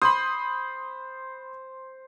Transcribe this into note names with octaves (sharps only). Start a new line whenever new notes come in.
C5 B5 C6 D#6